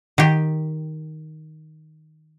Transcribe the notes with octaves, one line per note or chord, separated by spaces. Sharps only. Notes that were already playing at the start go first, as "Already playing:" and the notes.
D#3 G4